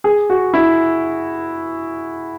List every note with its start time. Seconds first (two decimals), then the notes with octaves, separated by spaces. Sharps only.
0.04 G#4
0.30 F#4
0.54 E4